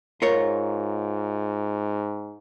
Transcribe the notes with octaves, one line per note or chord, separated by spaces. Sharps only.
G#2 F4 A#4 C#5